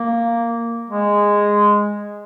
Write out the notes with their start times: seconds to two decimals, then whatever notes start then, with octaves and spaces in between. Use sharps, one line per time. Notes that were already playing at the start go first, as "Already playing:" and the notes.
Already playing: A#3
0.90 G#3